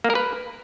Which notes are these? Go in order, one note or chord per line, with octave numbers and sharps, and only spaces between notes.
A#3
A#4
B4